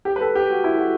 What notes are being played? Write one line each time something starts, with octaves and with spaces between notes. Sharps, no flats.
G4
B4
A4
G4
F#4
E4
F#4